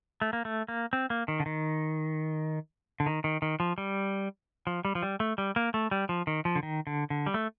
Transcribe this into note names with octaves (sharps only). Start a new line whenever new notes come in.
A3
A#3
A3
A#3
C4
A#3
D#3
D3
D#3
D3
D#3
D#3
D#3
F3
G3
F3
G3
F3
G3
A3
G3
A#3
A3
G3
F3
D#3
F3
D3
D#3
D3
D3
G3
A3